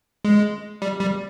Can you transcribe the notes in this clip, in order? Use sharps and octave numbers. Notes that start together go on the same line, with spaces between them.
G#3
G3
G3